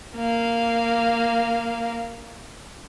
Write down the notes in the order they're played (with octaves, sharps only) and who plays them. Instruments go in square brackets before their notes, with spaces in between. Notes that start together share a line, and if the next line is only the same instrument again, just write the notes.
[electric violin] A#3 F5